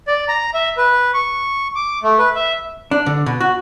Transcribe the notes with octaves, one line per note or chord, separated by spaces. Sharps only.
D5
A#5
E5
B4
C#6
D6
A3
B4
E5
D4
D3
B2
F#4